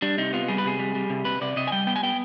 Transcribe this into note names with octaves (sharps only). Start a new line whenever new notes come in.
G3 D4
C3 D#4
B3 F4
G3 G#4
B4
C3 G#4
G3
G3
C3
C3 B4
C3 D5
C3 D#5
G#5
G3 G5
B3 G5
G#5
B3 G5